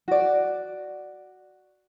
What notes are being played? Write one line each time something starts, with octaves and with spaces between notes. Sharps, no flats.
F#4 D5